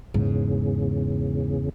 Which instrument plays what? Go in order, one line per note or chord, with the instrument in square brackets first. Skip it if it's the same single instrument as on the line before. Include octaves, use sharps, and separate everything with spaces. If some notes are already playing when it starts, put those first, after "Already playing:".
[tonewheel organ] E2 C#3 [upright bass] G#2